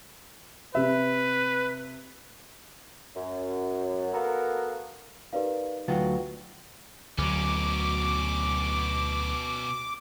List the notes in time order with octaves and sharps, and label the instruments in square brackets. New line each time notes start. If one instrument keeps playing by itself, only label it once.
[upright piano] C3 E5 [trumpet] B4
[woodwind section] F#2
A#3 B3 F#4 A4 A#4
[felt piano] D#4 A#4 D5 [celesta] G4 B4 F5
[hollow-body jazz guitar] D2 F#3 F4 [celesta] B4 F#5 G5
[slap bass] D2 F#3 [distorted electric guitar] B2 C#4 [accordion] D6